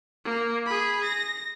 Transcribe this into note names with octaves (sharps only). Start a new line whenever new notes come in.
A#3
G#4 B5
A#6